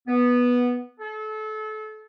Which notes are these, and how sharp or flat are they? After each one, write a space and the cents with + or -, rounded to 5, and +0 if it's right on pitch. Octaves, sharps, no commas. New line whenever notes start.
B3 -10
A4 -30